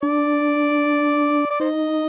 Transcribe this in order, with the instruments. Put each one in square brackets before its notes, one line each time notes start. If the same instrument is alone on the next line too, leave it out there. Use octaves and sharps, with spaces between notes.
[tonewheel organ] D4 [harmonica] D5
[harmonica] D5
[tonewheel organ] D#4 [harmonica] C5 D#5